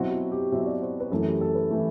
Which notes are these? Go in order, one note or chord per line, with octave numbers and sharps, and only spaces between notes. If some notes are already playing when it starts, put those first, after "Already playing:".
Already playing: B2 F#3 C4 E4 F#4
F#4
G4
B2 F#3 C4 E4 E5
D5
C5
B4
F#2 E3 A3 E4 A4
G4
A4
B4
E3 A3 E4